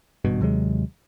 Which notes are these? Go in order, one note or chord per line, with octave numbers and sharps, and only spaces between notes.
G#1 G2 B2
D#2 C3 F#3 G#3